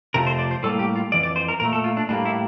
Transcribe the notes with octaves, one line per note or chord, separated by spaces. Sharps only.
F2 C3 F3 A3 A#4
C5
D5
C5
A2 G3 A#3 A4
G4
F4
F2 E3 D5
D5
C5
A#4
A#2 A3 A#4
A4
F4
D4
A2 G3 A#3 D4
E4